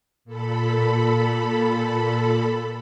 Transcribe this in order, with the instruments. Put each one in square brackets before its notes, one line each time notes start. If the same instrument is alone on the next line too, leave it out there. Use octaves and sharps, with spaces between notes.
[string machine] A#2 A4 B5